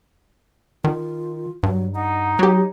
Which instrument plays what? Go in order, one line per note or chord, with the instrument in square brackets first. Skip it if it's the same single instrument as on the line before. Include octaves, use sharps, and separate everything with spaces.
[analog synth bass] D#3 [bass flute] F4
[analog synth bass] G2 [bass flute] F#3
[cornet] D#4 [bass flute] F#5
[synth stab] F#3 G4 [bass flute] C#5